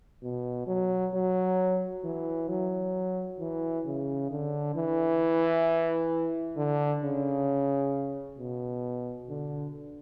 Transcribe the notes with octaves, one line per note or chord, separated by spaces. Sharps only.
B2
F#3
F#3
E3
F#3
E3
C#3
D3
E3
D3
C#3
B2
D3